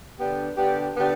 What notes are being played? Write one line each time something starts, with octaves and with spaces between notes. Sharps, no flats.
D3 B3 D4 G4
D3 B3 D4 G4
D3 B3 D4 G4